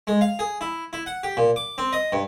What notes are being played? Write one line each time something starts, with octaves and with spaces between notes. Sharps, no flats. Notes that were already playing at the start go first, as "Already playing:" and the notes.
G#3
F5
G#4
E4
E4
F#5
G4
A#2
D6
C4
D#5
G2